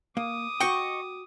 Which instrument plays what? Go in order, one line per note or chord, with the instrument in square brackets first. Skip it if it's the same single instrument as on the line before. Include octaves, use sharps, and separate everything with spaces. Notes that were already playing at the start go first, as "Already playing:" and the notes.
[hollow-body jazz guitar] A#3 [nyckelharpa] D6 D#6
[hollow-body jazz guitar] F#4 G5 [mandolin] D#5 C#6